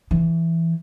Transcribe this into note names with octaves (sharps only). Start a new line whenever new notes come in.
E3